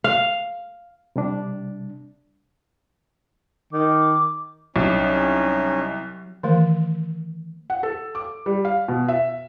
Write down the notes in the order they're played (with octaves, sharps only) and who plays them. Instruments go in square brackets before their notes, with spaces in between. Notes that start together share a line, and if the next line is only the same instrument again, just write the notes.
[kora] F5
[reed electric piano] C3 G3 D4
[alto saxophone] D#3 [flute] D6
[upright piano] C2 [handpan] F#3 [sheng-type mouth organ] C#4 D#4
[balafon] D#3 E3 A3 A#4
[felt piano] F#5
A4
D6
G3
F5
B2
E5